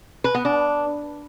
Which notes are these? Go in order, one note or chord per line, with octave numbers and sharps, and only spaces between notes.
B4
B3
D4